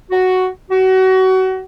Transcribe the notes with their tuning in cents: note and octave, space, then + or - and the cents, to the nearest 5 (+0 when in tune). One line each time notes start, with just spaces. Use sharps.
F#4 +5
F#4 +30